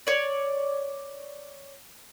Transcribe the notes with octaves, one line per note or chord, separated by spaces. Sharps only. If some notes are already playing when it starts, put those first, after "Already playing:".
C#5 D5